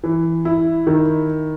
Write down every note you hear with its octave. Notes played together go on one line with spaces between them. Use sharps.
E3
E4
D#3